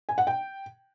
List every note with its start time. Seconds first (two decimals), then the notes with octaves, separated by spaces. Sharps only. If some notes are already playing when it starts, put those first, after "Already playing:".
0.09 G#5
0.18 F#5
0.27 G5